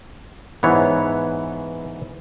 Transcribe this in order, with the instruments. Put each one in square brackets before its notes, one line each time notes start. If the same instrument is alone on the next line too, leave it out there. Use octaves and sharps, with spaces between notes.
[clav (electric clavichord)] G#2 E3 B3 C#5